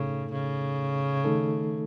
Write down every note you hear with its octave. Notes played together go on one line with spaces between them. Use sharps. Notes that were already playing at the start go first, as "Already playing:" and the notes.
Already playing: A2 C#3 A3 D#4 A4
C#3
D#3 A3 D#4 A4